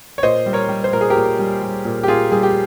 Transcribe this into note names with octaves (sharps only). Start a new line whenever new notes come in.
C#5
A#2 C5 D#5
G3
A#4 C#5
G3
C5
A#2 A#4
G#4
G4 A#4
A#2
G3
G3
A#2
G4
A#2 F4 G#4
G3 G#4
G4